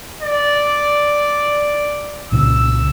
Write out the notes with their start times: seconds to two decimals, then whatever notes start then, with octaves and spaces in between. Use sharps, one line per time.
0.22 D5
2.32 C2 A#2 C#3 E6